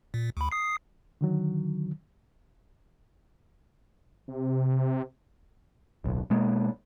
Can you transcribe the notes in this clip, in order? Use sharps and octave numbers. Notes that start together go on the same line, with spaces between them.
A#2
D2 B5
D#6 C7
D3 D#3 F#3
C3
D1 B1
B2 G#3 A#3